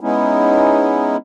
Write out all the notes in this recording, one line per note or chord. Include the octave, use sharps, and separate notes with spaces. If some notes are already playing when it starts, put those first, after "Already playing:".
G#3 B3 C#4 D#4 E4